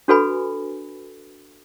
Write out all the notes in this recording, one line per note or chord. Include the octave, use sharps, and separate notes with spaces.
D4 F#4 A4 B4 G#5 B5